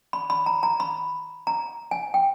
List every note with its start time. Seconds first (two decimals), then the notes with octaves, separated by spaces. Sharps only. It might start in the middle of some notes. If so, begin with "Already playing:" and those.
0.13 B5
0.30 B5
0.46 A#5
0.63 A#5
0.80 B5
1.47 A#5
1.91 G#5
2.14 G5